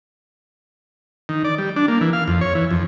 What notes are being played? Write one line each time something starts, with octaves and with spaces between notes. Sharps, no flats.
D#3
D5
G3
D4
A#3
E3
F5
F2
C#5
E3
F2